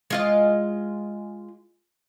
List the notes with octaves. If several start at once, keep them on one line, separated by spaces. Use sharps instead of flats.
G#3 F4 D#5